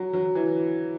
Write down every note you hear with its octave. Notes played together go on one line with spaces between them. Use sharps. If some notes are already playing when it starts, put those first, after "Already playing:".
Already playing: F#3
F#3
E3